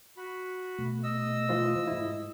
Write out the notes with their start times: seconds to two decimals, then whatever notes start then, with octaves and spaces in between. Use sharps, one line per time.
0.17 F#4 B5
0.78 B2 A3
1.03 D#5 E6
1.49 E3 F4 C5
1.87 G#2 E4